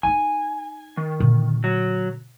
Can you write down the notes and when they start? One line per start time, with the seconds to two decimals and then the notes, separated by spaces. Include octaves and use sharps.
0.03 D#4 E4 G#5
0.97 D#3
1.20 A#2 D3
1.64 F#3